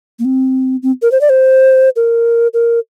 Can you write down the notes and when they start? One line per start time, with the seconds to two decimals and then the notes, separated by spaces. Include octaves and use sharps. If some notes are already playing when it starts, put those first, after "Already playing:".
0.19 A#3
0.25 C4
0.83 C4
1.02 A#4
1.12 C5
1.21 D5
1.29 C5
1.96 A#4
2.54 A#4